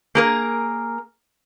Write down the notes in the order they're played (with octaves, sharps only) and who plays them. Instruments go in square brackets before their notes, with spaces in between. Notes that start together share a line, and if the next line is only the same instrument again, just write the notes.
[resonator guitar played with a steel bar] A#3 G#4 A#4